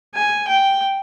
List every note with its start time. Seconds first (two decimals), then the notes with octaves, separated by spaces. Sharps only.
0.15 G#5
0.48 G5